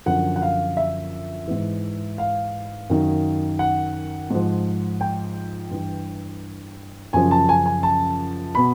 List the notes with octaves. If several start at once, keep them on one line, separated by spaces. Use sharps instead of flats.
F#2 D3 F3 F#5
F#5
F5
E5
G#2 E3
F5
F#2 D#3
F#5
G#2 F3
G5
G2 E3
F#2 C#3 F3 G#5
A5
G#5
G#5
A5
B2 B5